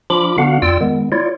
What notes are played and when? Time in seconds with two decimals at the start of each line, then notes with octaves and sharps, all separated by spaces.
0.10 F3 D4 F4 B5 D6
0.38 D3 B3 D4 F#4 F5 F#5
0.62 F2 F4 D5 G5 E6
0.81 D#3 G#3 B3
1.12 E4 F4 C#5 D5